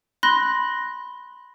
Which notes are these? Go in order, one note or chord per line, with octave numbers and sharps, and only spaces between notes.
B5 C6 F#6 A#6